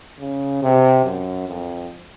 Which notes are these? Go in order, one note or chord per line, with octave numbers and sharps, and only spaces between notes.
C#3
C3
F#2
F2